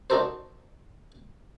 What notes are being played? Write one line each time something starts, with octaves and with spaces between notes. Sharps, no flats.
D4 D#4 F#4 A4 A#4 C5